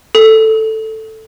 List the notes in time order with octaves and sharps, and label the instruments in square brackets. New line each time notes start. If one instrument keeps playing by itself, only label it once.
[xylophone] A4